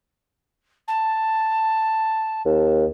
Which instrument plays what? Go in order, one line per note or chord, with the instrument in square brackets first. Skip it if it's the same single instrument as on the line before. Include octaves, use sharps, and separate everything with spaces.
[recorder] A5
[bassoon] D#2